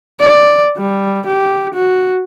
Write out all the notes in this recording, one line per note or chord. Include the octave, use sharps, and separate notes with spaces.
D5
G3
G4
F#4